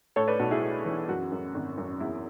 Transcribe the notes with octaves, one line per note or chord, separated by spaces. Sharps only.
A2 A4 C#5
B4 D5
B1 F#4 A4
E4 G#4
A3
E3
F#2 F#4
F#2
G#1
F#2
E2 E4